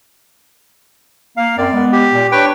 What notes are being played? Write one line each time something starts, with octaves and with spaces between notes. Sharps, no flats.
A#3 F5
F#2 C4 A#4 D5
G#3 B3
G4
A#2
D4 B4 C#5 G5